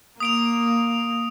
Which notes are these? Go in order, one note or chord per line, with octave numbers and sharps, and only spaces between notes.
A#3 D#6 D7 F7